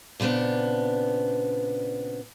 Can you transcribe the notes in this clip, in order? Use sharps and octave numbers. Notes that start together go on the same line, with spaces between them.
A#2 C#3 B3 C4 D4